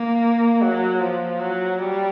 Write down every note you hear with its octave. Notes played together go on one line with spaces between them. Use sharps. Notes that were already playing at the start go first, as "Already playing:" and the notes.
Already playing: A#3
F#3
F3
F#3
G3